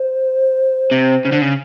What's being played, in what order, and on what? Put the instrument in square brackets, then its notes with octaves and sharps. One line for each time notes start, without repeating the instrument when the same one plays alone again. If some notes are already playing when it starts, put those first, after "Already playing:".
Already playing: [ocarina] C5
[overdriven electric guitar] C3
C#3
D3
C#3